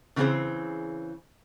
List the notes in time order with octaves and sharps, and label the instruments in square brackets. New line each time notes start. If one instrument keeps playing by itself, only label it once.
[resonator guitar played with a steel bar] C#3 E3 B3 C4 G#4 C5